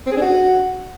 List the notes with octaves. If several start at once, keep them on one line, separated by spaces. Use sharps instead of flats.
C4
G#4
D4
F#4